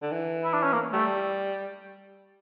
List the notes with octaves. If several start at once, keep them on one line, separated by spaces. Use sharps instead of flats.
D3
E3
E4
D4
C#4
A#3
G3 A3